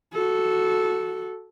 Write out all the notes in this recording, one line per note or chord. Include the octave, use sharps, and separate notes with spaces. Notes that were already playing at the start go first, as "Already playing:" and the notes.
F#4 A4